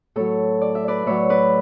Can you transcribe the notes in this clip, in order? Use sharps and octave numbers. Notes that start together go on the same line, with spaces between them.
A2 F#3 A4 C#5
D5
E5
B4 D5
A2 F#3 C#5 E5
B4 D5